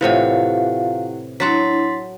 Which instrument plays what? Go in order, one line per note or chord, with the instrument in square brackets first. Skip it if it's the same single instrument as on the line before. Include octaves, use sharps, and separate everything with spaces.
[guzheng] A2 C3 E3 [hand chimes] E4 G4 F#5 [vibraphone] F4 F5
[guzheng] F#3 F#5 A5 [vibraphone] D4 E4 [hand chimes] C6 A6 B6